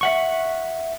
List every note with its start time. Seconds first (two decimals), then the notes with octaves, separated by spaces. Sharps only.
0.01 E5 F#5 C#6